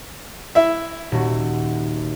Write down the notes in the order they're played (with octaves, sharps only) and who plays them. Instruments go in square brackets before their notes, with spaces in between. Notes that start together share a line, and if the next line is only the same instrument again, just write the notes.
[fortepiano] E4 E5
[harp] D#1 F#4